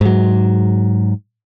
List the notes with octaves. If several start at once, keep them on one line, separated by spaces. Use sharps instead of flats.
G#2 F#3